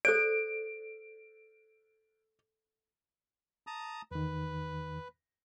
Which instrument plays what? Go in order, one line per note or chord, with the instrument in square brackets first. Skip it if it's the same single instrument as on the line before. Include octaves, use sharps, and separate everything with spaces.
[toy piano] A4 C5 D5 [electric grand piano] D7
[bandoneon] A5 A#5 D#6
[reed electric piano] E2 D#3 [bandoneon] B4